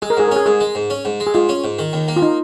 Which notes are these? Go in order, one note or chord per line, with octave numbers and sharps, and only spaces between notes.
G#3 G#4
A#4
G#2 G#4
A#4
C#4 G#4
G#2 G#4
G#3
G#2
C#4
G#2
G#3
G#4
G#2 F4
C#4
G#2
D#3
D#2
A#3
F4
D#4